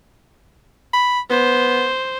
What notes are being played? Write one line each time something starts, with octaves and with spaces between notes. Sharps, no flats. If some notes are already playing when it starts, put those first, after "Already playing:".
B5
B3 C5